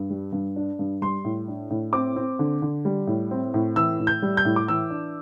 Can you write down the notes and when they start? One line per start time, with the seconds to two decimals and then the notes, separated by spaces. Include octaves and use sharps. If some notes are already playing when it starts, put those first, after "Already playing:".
Already playing: G2
0.10 G3
0.32 G2
0.56 D4
0.79 G2
1.01 G3 C6
1.24 A2
1.48 D4
1.70 A2
1.93 C4 D6
2.16 C4
2.39 D3
2.62 D3
2.85 G3
3.07 A2
3.31 C4
3.54 A2
3.76 E3 E6
3.99 A2
4.07 G6
4.22 G3
4.37 G6
4.45 A2
4.56 D6
4.68 E3 E6
4.90 D4